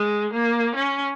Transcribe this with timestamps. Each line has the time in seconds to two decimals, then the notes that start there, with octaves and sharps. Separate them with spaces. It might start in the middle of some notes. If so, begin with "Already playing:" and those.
Already playing: G#3
0.33 A#3
0.76 C#4